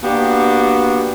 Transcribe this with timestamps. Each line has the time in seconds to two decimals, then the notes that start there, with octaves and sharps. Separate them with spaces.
0.03 A#3 B3 D4 F#4 G4